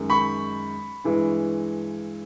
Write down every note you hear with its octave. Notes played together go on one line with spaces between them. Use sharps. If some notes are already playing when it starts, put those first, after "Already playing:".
Already playing: F#2 D#3 G#3
B5 C#6
G2 E3 G#3